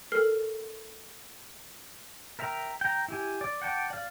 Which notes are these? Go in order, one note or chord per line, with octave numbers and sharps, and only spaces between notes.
A4 A#4 F6 C7
A#4 E5 G5 A#5
G5 A#5
E4 G4 G#5
D5
F#5 G5 A5 D6
D5 F5